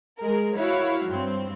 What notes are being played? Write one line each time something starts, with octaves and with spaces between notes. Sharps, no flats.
G#3 G#4 A#4
E4 F#4 C#5 F5
G2 C4